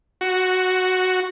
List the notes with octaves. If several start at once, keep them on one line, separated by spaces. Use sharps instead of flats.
F#4